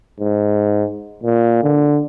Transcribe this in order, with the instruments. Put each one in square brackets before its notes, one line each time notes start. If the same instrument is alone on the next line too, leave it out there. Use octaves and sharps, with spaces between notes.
[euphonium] G#2
A#2
D3